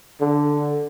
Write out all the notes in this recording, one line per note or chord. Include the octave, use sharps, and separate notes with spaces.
D3